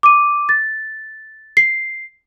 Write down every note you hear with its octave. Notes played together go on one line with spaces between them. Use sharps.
D6 D#7
A6
C7